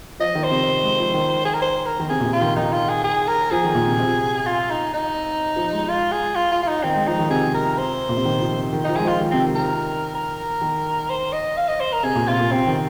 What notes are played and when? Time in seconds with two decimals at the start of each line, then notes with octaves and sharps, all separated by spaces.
0.20 F3 D#5
0.35 D#3
0.44 C5
0.51 C3
0.83 G#3
0.99 F3
1.14 D#3
1.45 G#4
1.54 A#4
1.62 C5
1.86 A#4
1.99 D#3
2.09 C3 G#4
2.20 A#2
2.25 C3
2.33 F4
2.41 D#3
2.56 D#3 D#4
2.72 F4
2.89 G#4
3.04 G#4
3.28 A#4
3.51 F3 G#4
3.64 D#3
3.75 A#2
3.87 C3
3.99 C3
4.46 F4
4.70 D#4
4.94 D#4
5.56 F3
5.73 G#3
5.89 F4
6.12 G#4
6.35 F4
6.52 F4
6.63 F4
6.67 D#4
6.84 D#3 C4
6.95 G#3
7.07 F3 D#4
7.19 D#3
7.30 C3 G#4
7.54 A#4
7.78 C5
8.09 A#2
8.17 C3
8.25 D#3
8.41 F3
8.57 C3
8.73 D#3
8.84 F3 D#4
8.96 G#3 G#4
9.04 F3 F4
9.20 D#3
9.31 C3 C4
9.45 D#3
9.56 A#4
10.15 A#4
10.61 D#3
11.10 C5
11.33 D#5
11.57 F5
11.68 D#5
11.80 C5
11.93 A#4
12.03 C3 G#4
12.16 A#2
12.28 C3 F4
12.40 A#2
12.51 C3 C4
12.67 D#3